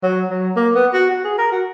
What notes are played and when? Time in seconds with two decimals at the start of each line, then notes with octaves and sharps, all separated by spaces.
0.03 F#3
0.30 F#3
0.56 A#3
0.75 B3
0.93 F#4
1.10 F#4
1.24 G#4
1.38 A#4
1.52 F#4